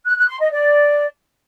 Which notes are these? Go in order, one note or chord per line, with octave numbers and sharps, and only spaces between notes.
F#6
F#6
C6
D#5
D5